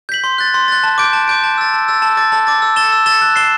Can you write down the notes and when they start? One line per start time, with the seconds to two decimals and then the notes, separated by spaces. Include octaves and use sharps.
0.09 G6 B6 F#7
0.24 C6
0.38 F#6 A6
0.54 C6
0.68 F#6 A6
0.83 A5
0.98 D6 G6 D7
1.13 A5
1.28 D6 G6 D7
1.44 A5
1.58 E6 A6
1.73 A5
1.88 E6 A6
2.02 A5
2.17 D6 A6
2.32 A5
2.47 D6 A6
2.62 E6
2.76 A6 E7 G7
2.92 E6
3.06 A6 E7 G7
3.22 F#6
3.36 C7 E7 G7